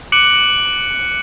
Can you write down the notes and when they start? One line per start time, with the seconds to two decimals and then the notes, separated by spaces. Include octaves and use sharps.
0.12 D6 F#6 C#7 D7 F#7